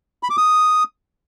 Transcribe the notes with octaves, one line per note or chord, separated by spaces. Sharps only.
B5
D6
D#6